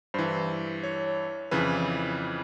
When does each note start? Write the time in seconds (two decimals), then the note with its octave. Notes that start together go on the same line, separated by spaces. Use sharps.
0.14 G2 E3 C5
0.83 C#5
1.51 F2 C#3 E3 B4